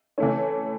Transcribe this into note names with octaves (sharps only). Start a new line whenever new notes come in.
E3 A3 C#4